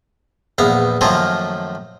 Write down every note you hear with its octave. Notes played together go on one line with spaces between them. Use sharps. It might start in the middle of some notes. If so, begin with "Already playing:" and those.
A#1 E2 B3 F5
F#2 D#3 F3 A3 A#3 F4